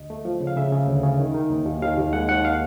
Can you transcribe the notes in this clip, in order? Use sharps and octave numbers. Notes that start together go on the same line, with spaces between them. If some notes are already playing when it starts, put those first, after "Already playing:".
Already playing: D2 D#5
A3
F3
C#3
F5
C#3 E5
C#3
D2
C#3
D#3
D#3
D#2
D#2
D#2 F5
D#2
G#3 F#5
D#2 F#5
F5